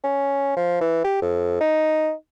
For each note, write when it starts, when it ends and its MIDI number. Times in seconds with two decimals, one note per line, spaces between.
0.04 0.52 61
0.57 0.80 53
0.81 1.04 52
1.05 1.19 67
1.22 1.59 41
1.61 2.12 63